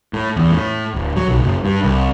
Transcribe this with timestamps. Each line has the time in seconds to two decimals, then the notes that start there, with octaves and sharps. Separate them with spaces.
0.13 A2
0.36 E2
0.52 A2
0.94 D1
1.17 F#3
1.28 B1
1.42 F#1
1.64 G2
1.84 C2